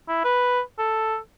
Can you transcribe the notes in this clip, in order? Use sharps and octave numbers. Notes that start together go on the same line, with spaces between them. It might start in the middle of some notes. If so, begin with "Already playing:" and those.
E4
B4
A4